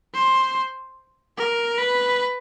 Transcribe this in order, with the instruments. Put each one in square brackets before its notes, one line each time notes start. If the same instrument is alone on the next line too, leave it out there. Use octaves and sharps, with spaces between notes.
[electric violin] C5
A#4
B4